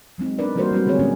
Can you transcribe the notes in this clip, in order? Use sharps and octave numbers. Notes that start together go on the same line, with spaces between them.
F#3 G#3 C4 D#4
B3 D4 D#4 A#4 B4 D5
E3 G3 A#3 F#4 A#4 C5
F#3 G3 C4 D4 F#4 B4
D3 G#3 C4 G#4 C#5
A#2 D#3 A3 A#3 C#4